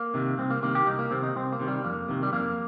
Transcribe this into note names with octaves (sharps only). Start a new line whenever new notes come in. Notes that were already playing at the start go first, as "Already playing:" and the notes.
Already playing: A#3
C3 D#3
C2 C4
A#3
C3 D#3 A#3
G4
C2 D#4
A#3
C3 D#3 C4
D#4
C2 C4
A#3
C3 D#3
G3
F2 A#3
C3 D#3
G3
F2 A#3